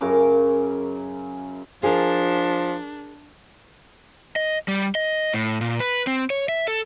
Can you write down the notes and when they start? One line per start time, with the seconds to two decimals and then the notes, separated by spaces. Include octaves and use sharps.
0.01 F#2 C#3 A#4 D6
1.83 F3 D4 G#4 A#4
4.36 D#5
4.68 G3
4.95 D#5
5.34 A2
5.61 A#2
5.80 B4
6.07 C4
6.30 C#5
6.49 E5
6.68 A4